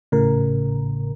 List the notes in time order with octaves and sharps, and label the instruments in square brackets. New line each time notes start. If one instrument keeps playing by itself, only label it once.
[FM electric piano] G#1 A2 C#3 A#4